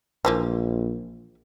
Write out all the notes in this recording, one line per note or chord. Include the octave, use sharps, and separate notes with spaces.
A#1 E3 F3 A#3